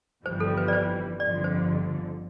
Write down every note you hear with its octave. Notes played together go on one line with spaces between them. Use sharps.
G1 F2 E3 G3 C5
A4
B4
D5
C5
G1 F2 D3 D5
C5